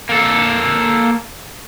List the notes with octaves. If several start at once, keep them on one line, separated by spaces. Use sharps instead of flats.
A#3 A4